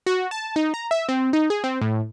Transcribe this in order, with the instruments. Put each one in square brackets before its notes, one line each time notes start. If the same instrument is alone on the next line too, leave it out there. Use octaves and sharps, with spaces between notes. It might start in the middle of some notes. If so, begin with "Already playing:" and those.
[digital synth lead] F#4
A5
D#4
A#5
E5
C4
D#4
G#4
C4
A2